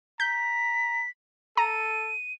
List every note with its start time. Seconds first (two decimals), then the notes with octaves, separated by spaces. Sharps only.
0.20 A#5 G6 B6
1.57 A4 A#5 D#7